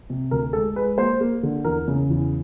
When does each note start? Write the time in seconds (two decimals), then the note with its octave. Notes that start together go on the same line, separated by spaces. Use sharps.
0.10 C3
0.31 D2 A#4
0.53 G#3 A4
0.76 G#3 B4
0.98 A#3 C5
1.21 A#3
1.43 D3
1.64 E2 A#4
1.88 C#3
2.10 E2